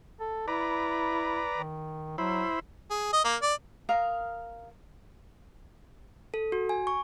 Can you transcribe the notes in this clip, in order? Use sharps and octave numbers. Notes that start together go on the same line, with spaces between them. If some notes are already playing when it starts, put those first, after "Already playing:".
A4
E4 B4 D5 A#5
D#3
F#3 E4 C5 B5
G#4
D#5
A#3
D5
A#4 F5 A#5 D#6
A4
F#4
G#5
C#6